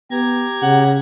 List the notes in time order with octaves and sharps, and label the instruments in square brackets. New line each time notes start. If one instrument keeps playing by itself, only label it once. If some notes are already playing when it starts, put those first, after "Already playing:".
[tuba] B3 [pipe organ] G4 A#5 G#6
[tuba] C#3 [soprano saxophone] F#5